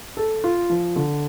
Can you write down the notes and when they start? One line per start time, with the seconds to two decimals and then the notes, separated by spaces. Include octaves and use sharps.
0.17 A4
0.44 F4
0.70 F3
0.96 D3